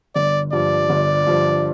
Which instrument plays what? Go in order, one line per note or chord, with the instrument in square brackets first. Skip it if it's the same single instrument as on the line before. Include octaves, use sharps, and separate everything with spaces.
[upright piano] G1 [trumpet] D5
[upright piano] G2 F3 [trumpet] D5
[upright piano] G1
G2 F3